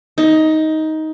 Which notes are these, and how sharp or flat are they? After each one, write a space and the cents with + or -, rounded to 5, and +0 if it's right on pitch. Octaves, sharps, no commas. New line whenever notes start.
D#4 +15